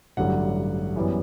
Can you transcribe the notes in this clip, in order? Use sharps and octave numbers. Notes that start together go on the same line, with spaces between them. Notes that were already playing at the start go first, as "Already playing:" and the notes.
A1 G2 D3 F#3 A3 F#5
F#2 E3 G3 B3